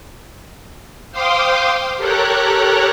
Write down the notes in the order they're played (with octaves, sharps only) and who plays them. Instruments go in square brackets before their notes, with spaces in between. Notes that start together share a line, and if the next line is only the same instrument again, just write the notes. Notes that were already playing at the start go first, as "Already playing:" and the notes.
[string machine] C5 F5 G5 C6 D6 D#6
G4 A4 A#4 C#5 A#5 F#6